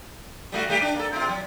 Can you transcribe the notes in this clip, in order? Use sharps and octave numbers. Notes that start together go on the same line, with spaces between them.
G3 A3 F#4
G3 A3 G4
D4
A#3 A4
B2 F4
F#3